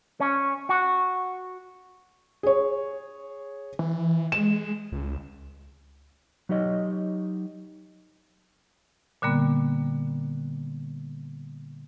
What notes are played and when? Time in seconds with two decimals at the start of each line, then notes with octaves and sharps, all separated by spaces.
0.20 C#4
0.69 F#4
2.43 G#4 C#5
3.79 E3
4.32 G#3 E7
4.92 C#2
6.49 F#3 D#4 G4 C#5 D#5
9.22 A#2 D3 G3 A#3 B3